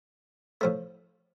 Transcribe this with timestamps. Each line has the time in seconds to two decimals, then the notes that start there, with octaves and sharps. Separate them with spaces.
0.61 A2 F3 A3